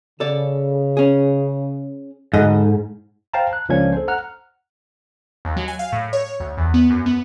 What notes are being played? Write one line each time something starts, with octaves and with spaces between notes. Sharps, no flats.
C#3 A4 D5
C#4 G#4
D2 G#2 E4 A4 D#5
C5 F5 G5 A5 A#5
F#6
C#2 F3 A#3 C#4 D4 G#6
A4 C5
F#5 A#5 F6 F#6
D#2
F#3
G#5
F5
A2
C#5
C#5
D2
E2
B3
F#2
B3